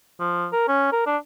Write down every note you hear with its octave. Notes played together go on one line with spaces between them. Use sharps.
F3
A#4
C#4
A#4
D4